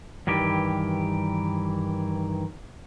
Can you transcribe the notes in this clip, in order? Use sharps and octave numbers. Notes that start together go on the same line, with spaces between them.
G2 D#3 E3 G4